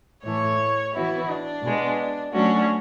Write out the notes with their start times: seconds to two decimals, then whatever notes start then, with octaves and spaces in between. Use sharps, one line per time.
0.24 A2 E3 A3 C#5
0.94 E3 B3 E4 F#4
1.29 D4
1.63 B2 G#3 B3
2.33 F#3 A3 C#4 D4 F#4